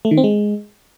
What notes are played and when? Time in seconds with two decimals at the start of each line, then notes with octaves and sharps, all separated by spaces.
0.05 A3
0.11 D#3
0.17 C4
0.24 G#3